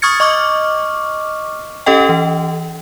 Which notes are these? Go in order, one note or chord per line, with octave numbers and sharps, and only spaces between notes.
C#6 D#6 F6 G#6 A6 C#7
D#5 C#6 D6 F6
C#4 G4 A4 D#5 G5
E3